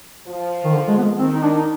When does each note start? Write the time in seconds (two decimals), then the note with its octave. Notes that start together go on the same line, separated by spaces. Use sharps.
0.27 F3
0.64 D#3
0.73 D3
0.88 G#3
0.97 B3
1.03 G#3
1.19 D#3 C4
1.34 D#4
1.42 D4
1.57 D#4